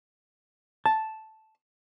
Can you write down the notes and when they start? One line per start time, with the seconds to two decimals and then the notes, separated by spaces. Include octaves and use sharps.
0.86 A5